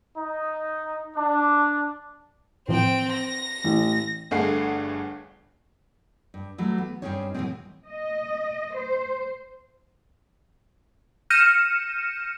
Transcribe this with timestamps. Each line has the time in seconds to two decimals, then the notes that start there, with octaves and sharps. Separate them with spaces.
0.17 D#4
1.17 D4
2.68 A2 E3 F3 C4 G5
3.12 A#6
3.64 A1
4.31 G1 G2 A3 G#4 F#5 C7
6.34 G2
6.58 E3 F#3 G3 A3
6.78 B3
7.02 G2 C#3 C4 C#4 D#4 C#5
7.34 B2 E3 F3 G3 G#3 C4
7.86 D#5
8.74 C5
11.30 F6 G6 A#6 C#7 D#7 E7